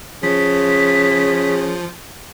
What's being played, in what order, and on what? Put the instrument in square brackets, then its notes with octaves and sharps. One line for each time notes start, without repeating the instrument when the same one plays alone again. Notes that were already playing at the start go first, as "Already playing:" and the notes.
[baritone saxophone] C#3 [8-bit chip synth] F3 [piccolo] B6